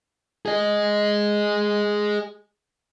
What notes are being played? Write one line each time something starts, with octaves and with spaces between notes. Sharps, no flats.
G#4 D#5